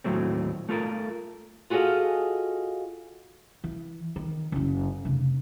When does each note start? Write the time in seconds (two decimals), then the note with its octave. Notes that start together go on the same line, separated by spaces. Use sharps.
0.04 D#2 A2 F#3 A3 C4
0.69 A3 F4 A4 A#4
1.70 F4 F#4 G#4 A4 D#5 F5
3.64 E3
4.16 D#3
4.52 F#1 C#4
5.05 F1 C#3